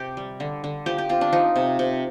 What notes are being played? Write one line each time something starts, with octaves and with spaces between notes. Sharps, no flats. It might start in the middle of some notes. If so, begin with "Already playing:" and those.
Already playing: C3 G4
G3
D3
D3
F3 G4
G4
C4 F4
D4
F3 D#4
C3
C3